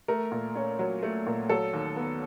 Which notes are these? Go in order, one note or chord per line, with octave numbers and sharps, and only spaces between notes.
A3 A#4
A#2
C#4
F#3
A3
A#2
F#3 A4
D#2
B3